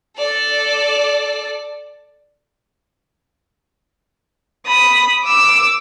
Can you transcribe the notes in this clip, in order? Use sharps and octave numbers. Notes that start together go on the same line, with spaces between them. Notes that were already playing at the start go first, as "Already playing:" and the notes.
A4 D5
B5 D#6
D6 E6